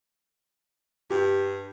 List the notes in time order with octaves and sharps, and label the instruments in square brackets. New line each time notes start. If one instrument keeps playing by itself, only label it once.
[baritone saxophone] G2 [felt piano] G4